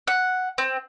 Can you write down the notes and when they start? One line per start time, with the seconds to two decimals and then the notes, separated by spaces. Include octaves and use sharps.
0.07 F#5
0.58 C4